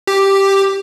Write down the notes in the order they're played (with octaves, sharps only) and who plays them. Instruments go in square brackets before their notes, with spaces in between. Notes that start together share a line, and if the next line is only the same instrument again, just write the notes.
[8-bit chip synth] G4